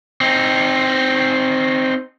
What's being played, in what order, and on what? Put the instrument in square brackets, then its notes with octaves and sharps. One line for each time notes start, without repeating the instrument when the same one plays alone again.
[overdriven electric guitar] C4 D#4